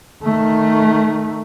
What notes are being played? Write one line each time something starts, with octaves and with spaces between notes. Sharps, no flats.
D#3 A3